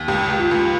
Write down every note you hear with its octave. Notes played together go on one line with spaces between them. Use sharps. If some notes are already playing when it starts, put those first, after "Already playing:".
Already playing: D#2
C#2 G4
C#2
F4
C#2